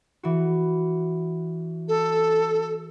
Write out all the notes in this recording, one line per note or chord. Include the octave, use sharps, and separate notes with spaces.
E3 F#4
A4